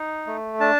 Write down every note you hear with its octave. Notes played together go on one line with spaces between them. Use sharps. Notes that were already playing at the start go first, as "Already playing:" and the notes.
Already playing: D#4
A3
D4 A5